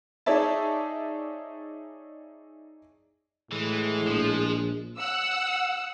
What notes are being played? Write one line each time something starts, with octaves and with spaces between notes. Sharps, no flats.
D#4 G#4 C#5 D5 E5 A5
A2 E3 G#3
A#1 F3
F#5 E6